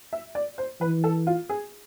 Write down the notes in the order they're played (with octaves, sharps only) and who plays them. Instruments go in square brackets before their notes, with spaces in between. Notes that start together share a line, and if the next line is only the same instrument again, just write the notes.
[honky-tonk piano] E5
D5
C5
[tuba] E3 [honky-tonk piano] B4
[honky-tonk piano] A4
F4
G#4